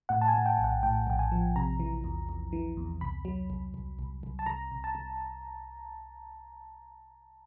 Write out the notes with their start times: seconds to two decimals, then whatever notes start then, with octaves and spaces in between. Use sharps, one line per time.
0.09 A2 F#5
0.21 A5
0.28 G#5
0.34 A2
0.46 G5
0.58 A#1
0.64 F#5
0.83 A2 G5
1.07 A#1 G5
1.19 G#5
1.32 F3
1.56 C3 A#5
1.80 E3
2.04 E2
2.29 E2
2.53 E3
2.77 E2
3.01 C2 B5
3.25 F#3
3.50 C2
3.74 C2
3.99 C2
4.23 C2
4.39 A5
4.46 C2 A#5
4.71 C2
4.84 A5
4.95 C2